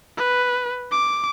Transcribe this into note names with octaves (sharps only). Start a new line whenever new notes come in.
B4
D6